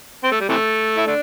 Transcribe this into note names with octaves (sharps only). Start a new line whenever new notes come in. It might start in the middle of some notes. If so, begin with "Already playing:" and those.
C4
A3
G3
C3 E3 A3
E4
A3 D4